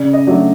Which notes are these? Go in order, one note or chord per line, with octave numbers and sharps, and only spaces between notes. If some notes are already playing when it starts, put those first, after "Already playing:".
Already playing: C#3 D5
D#5
F#3 A3 D4